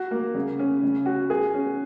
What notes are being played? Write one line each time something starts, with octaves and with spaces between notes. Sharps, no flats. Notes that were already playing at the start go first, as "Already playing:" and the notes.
Already playing: F#4
A#3
C#3
C#4
C#3
F#4
G#4
C#4